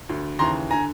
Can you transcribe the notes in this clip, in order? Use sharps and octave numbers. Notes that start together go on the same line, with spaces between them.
D2 D3
D#2 C#3 E3 A#5 C6
D3 G#5 A#5